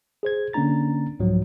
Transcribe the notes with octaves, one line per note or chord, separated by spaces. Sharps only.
G#4 C5 G#6
D3 A#3 C#4 D4 A#5 A6
C2 G#2 F3 F#3